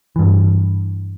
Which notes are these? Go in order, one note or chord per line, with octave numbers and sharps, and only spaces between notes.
G2 E3